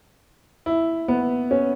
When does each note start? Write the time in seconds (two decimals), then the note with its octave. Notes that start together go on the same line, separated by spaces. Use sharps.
0.66 E4
1.08 B3
1.51 C#4